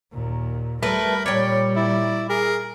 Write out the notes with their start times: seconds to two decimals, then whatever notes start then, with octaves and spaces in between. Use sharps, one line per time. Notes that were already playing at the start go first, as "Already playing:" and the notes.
0.13 D#2 A#2
0.83 G3 A3 A#4 B4 B5
1.26 A#2 G3 C#5 D5 G5
1.76 E4 D5
2.30 G#4 A#4